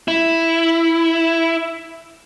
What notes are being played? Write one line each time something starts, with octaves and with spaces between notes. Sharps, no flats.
E4